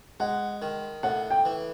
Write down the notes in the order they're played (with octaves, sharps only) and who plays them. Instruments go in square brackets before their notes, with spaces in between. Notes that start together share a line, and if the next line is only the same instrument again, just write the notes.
[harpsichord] G#3 [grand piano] F#5
[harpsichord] D#3
[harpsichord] A2 [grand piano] F#5
[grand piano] G5
[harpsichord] E3